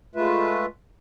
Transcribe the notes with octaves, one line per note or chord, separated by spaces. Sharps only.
G#3 A3 F4 B4 E5